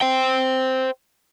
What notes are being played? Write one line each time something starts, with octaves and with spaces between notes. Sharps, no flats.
C5 G5